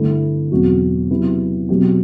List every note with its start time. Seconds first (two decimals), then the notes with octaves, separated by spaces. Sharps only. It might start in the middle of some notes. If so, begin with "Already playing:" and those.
Already playing: G2 D3 A3 E4
0.51 E2 B2 F#3 C4 F#4
1.10 C3 F#3 B3 E4 G4
1.69 B2 F#3 C4 G4